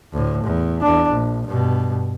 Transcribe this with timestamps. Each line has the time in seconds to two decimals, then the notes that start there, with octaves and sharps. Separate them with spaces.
0.12 D2 A2
0.44 E2
0.81 E2 D4
1.10 A#1
1.47 G2 B2